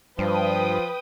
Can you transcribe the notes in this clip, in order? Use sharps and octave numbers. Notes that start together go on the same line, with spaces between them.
G2 F3 B4 G5 D#6